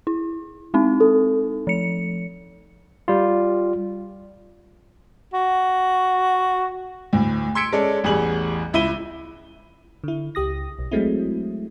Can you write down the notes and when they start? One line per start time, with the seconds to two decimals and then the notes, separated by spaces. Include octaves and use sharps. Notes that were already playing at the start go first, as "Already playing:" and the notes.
0.07 E4
0.74 G#3 C4 D#4
1.00 A4
1.67 F3 C#7
3.08 G3 F4
5.34 F#4
7.13 D2 A2
7.55 C6 E6 G#6 B6 C#7 D7
7.73 G#3 C#4 A4 D5
8.04 A1 E2 G3 G#4 F#7
8.73 C#2 E4 E5 B5 D#7 G7
10.04 D3 E4
10.35 C#2 G4 D#6 A#6
10.79 B1
10.91 F#3 G#3 A3 C4 E4